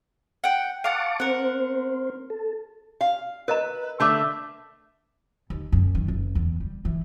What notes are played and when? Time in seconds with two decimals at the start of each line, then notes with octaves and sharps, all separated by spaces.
0.44 F#5 G5
0.84 F5 F#5 A5 C#6 D6
1.20 C4 A#4 C5 F#5
2.30 A4
3.01 F5
3.48 A#4 B4 D#5 A#5
4.00 D3 A3 E5 A5 D6
5.50 D#2
5.72 F#2
5.95 D#3
6.08 F#1
6.35 E2
6.60 G3
6.85 E3